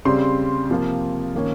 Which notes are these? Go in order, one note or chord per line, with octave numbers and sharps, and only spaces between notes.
C#3 G3 C4 C6
C3 F3 A#3 F4
D#3 A#3 C#4 F4